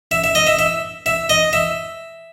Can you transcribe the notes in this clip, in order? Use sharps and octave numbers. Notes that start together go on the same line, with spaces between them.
E5
E5
D#5
E5
E5
E5
D#5
E5